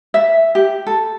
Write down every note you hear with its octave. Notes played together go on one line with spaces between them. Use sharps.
E5
G4
A4